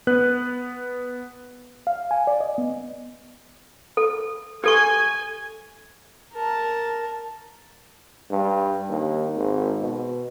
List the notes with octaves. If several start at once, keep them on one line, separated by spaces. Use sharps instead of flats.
B3 B4 F#6
F5
G#5
D5
D#5
B3
A4
G4 A4 G#5 C#6
A#4 A5
G2
D#2
G#1
B2